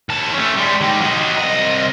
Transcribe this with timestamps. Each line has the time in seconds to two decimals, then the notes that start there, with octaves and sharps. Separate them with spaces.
0.09 D#2 A5
0.34 A3 C#4
0.56 G3 G#3
0.81 D#3 G4
1.01 F#3 D#5
1.37 C2 D#5